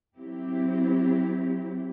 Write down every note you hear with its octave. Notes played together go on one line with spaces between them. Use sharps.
F#3 C4 E4 G4